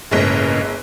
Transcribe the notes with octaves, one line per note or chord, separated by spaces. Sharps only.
G1 A2 C#3 G#3 A#3